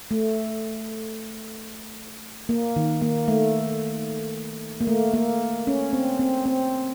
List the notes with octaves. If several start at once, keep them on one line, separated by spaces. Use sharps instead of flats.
A3
A#3
D#3
A#3
A3
A#3
A3
A#3
C#4
C4
C4
C4